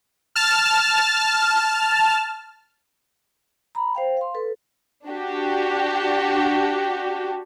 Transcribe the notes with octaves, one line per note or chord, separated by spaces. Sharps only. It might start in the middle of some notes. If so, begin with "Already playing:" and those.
A5 F6
A#5 B5
C5 F5 G5
F5 C6
A4 B4
D4 F#4 G4